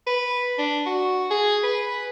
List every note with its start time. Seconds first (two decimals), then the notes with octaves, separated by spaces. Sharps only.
0.07 B4
0.58 D4
0.86 F#4
1.31 G#4
1.63 B4